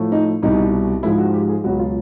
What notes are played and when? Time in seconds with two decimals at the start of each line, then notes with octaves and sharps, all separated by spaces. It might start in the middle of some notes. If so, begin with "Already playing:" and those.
Already playing: A2 F3 A3
0.12 D#4
0.42 C2 B2 G3 D#4
1.03 G#2 F3 G#3 E4
1.18 F#4
1.34 G4
1.49 G#4
1.64 C#2 B2 F#3 F#4
1.79 F4